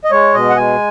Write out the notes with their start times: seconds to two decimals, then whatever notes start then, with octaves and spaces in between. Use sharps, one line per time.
0.05 D#5
0.11 G#3 C#5
0.34 B2 D#5
0.50 F#5
0.57 G#3 G#5